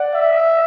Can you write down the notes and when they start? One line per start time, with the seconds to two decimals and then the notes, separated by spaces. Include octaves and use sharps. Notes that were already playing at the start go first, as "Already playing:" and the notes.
Already playing: D5 F#5
0.14 E5